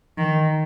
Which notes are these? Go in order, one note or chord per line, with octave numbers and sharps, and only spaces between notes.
D#3